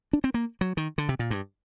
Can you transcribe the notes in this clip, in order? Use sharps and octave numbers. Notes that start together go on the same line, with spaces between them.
D4
C4
A#3
F#3
D#3
D3
C3
A#2
G2